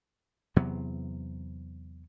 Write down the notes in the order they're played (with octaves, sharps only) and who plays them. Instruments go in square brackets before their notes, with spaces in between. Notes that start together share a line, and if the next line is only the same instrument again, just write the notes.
[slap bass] E2 C3 F#3 B3